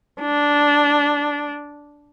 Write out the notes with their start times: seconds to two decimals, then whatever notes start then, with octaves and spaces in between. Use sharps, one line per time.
0.21 D4